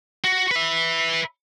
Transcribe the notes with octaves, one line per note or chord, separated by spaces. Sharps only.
F#4
B4 E5